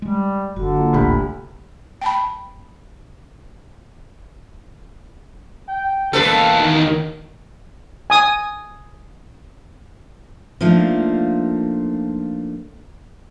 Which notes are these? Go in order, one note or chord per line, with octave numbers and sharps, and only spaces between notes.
G3 G#3
F#1 D3 F#4
A#3 F4 A#5
D#1 A1 D2 C3 G4 B5
G5 A5 B5
G5
E2 A#3 A4 B4 F5
D#3
G#5 D#6
F3 A3 A#3 D4 D#4 F4